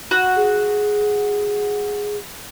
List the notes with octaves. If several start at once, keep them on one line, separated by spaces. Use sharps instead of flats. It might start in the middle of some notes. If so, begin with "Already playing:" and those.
F#4
G#4